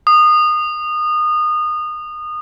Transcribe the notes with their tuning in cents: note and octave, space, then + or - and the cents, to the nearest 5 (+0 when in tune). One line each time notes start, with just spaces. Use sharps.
D#6 -25